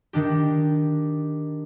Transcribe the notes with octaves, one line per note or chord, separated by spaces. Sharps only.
D#3 D4 G4